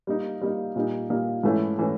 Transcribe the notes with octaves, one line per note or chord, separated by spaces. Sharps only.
G3 A#3 D#4
G3 A#3 D#4
A#2 G3 A#3 D#4
A#2 G3 A#3 D#4
G#2 E3 A3 C#4 E4
E3 A3 C#4 E4